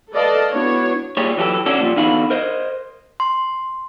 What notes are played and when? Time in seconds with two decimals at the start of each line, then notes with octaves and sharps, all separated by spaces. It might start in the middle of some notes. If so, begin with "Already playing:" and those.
0.13 A4 B4 D5 D#5 F5 A5
0.52 B3 D4 E4 F#4 C#5
1.17 A#2 G3 G#4 C#5
1.37 E3 F#3 E4 G4 A4
1.66 D3 C#4 D4 F#4 A4
1.81 A#2 F3 G3
1.96 E2 D3 D#4 F#4 F5 B5
2.30 A#4 C5 D#5
3.20 C6